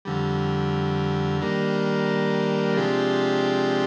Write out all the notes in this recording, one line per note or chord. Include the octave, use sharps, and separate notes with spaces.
F2 D3 G3
D#3 G3 A#3 D4
C3 F3 G#3 D4 G4